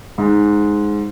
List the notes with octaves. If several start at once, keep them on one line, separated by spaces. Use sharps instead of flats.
G#2